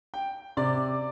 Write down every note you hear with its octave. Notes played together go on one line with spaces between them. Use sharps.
G5
C3 D5